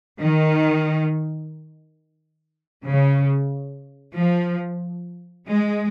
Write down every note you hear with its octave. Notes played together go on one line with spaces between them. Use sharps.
D#3
C#3
F3
G#3